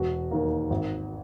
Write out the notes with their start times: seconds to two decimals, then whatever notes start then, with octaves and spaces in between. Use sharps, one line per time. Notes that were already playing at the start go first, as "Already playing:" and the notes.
Already playing: E1 F#4
0.31 D#2 D#3 A#3
0.70 G#1